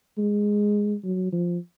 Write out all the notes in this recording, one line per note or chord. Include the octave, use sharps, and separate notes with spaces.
G#3
F#3
F3